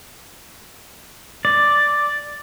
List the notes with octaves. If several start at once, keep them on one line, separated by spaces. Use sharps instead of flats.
D5